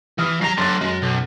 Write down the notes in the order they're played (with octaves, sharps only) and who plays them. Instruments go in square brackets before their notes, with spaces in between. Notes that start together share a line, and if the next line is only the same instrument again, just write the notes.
[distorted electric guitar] E3 [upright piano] D#6 F6
[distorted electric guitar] F#3 A#5 [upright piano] A#6 C7
[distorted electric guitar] D3 F#3 [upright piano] C6 F#6 A6
[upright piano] F#2 [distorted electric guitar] G#3
[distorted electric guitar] B1